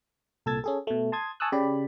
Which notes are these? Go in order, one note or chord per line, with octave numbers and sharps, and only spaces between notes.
C2 A#2 A4 E6 G#6 A6
C#4 G#4 A4
B2 A3
A5 C6 D#6 G#6
G#5 A5 C#6 D#6 E6 F#6
C#3 G4 D5 B5